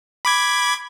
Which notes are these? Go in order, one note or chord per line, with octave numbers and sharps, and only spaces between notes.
B5 D6 G#6